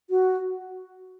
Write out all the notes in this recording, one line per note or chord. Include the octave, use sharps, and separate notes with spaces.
F#4